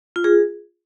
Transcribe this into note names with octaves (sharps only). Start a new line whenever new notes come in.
F4
G#4